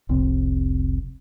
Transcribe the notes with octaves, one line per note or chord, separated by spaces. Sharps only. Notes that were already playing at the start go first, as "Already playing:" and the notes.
F1 C2 C3 C4